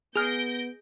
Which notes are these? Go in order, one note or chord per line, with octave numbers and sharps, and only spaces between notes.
B3 G#4 F6 G6 A#6 D7 F7